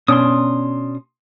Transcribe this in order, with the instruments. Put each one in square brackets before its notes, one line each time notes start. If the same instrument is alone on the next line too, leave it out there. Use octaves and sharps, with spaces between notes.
[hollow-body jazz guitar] B2 C#4 D4 [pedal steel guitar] C6 D#6